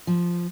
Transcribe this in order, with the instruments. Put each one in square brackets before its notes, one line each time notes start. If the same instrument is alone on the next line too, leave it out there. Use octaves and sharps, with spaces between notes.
[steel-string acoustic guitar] F3